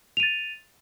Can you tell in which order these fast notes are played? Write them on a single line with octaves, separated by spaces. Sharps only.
F7 D#7 A6